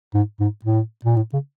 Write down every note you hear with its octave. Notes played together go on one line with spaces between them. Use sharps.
G#2
G#2
A2
A#2
A2
C#3